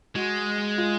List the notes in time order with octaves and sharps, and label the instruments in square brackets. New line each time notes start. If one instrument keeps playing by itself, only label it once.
[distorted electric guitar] G#3 [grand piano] F#4
[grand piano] F4